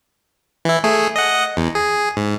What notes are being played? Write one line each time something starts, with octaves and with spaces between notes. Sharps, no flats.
E3 E4
A3 G#4
D#5 F#5
E2
G#4
G#2